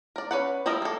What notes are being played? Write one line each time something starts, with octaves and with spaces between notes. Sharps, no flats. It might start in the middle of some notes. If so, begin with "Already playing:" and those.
A#4 D5
C#4 B4 F#5
F3 G3 E4 A#4 D#5
A#3 A4